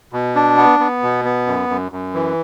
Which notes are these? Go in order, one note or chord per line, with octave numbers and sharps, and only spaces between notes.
B2
D4
B3
B3
B2
B3
F#2
F#2
F#2
E3